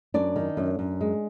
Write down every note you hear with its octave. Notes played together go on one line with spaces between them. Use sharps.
F#2 D4 D5
D#3
F#2
F#2
G#3